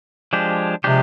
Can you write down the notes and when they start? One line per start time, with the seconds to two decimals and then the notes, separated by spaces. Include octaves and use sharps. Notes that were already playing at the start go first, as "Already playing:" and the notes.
0.33 F3 G#3 D4 G4
0.84 C3 F3 G#3 D4 G4